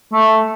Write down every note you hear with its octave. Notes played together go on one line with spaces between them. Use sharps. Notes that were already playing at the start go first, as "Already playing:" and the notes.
A3